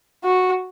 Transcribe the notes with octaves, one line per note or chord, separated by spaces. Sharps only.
F#4